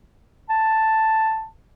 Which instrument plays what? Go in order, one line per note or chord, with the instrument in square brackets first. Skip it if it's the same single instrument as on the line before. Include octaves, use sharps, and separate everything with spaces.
[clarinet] A5